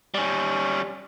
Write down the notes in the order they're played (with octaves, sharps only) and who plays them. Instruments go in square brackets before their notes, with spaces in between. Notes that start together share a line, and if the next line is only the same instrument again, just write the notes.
[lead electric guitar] G3 C#4